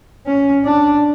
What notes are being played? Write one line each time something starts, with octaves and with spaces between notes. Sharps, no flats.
C#4
D4